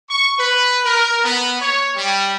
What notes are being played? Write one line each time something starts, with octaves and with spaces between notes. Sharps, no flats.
C#6
B4
A#4
B3
C#5
G3